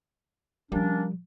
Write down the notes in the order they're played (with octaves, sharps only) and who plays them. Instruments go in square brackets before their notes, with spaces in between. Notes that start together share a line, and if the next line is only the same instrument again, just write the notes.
[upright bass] C3 F3 [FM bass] G3 [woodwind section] A#3 C#4 D4